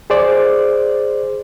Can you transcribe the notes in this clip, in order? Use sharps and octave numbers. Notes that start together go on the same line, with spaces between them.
G#4 C5 D5